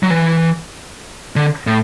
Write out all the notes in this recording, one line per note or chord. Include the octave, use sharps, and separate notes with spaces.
F#3
E3
D3
A2